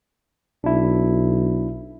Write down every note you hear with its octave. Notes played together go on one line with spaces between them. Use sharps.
B1 D4 E4